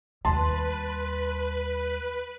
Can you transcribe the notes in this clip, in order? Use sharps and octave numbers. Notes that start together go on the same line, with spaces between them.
D#2 G3 B4 A5 C6